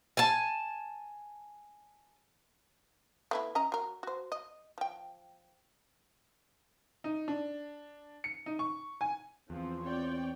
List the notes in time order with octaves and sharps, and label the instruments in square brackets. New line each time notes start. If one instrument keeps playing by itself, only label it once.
[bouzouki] G#5 A5
[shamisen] A3 B3 E4
C#4 D#5 A#5
F#3 A#4
F#4 C5
D#5
F3 G5
[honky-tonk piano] D#4
D4
C#7
D#4
C#6
G#5
[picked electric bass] E2 [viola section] F3 C4 [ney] F4
[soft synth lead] C4 [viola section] C#5 D5 G5